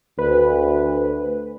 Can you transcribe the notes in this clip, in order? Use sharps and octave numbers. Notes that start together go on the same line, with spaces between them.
D2 B4